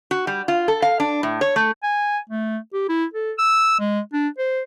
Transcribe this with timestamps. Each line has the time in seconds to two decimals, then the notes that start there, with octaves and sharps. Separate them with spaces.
0.11 F#4
0.27 G3
0.48 F4
0.68 A4
0.82 F5
1.00 D4
1.23 A2
1.41 C#5
1.56 A3
1.83 G#5
2.30 A3
2.73 G4
2.89 E4
3.14 A4
3.39 E6
3.80 G#3
4.13 D4
4.38 C5